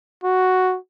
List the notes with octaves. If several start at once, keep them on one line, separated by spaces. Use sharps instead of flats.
F#4